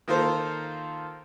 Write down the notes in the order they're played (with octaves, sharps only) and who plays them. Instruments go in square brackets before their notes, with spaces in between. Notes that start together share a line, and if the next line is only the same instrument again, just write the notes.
[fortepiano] D#3 A#3 F4 A4 C5